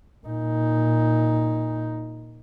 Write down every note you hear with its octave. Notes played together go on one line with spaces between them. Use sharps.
A#2 D#4